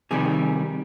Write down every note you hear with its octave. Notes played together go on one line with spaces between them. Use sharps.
F2 C3 D#3 G3 G#4